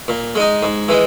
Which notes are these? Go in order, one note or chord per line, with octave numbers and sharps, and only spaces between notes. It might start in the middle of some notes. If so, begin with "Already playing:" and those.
A#2
G#3 D#4
G#2
E3 G#3